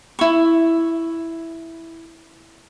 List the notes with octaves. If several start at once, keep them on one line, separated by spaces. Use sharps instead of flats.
E4 C#6